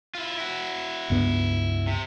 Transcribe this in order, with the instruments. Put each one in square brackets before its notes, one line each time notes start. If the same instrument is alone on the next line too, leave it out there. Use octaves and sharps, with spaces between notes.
[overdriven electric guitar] E4 F4
E4 F#4
[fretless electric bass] C#2 G2 B3
[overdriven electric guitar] C3